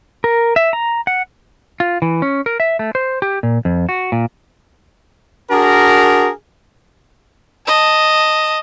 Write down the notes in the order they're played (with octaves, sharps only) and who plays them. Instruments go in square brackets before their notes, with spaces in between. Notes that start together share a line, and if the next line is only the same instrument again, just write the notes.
[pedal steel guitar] A#4
E5
A#5
F#5
[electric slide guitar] F4
E3
C#4
A#4
E5
A3
C5
G4
A#2
F2
F#4
A#2
[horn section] D4 F#4 G#4 A#4
[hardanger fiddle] D#5 A5